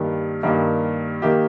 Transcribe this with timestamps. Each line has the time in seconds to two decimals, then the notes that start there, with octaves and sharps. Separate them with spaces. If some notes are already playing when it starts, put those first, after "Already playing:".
Already playing: G2 D#3 A#3 G4
0.43 G2 D#3 A#3 G4
1.22 D#3 A#3 G4